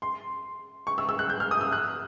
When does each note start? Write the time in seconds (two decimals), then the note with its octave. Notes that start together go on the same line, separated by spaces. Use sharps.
0.02 C6
0.87 C#6
0.98 E6
1.09 E6
1.19 F#6
1.30 G6
1.40 F6
1.51 D#6
1.61 E6
1.72 F#6